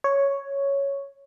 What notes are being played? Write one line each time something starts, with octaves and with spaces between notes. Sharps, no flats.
C#5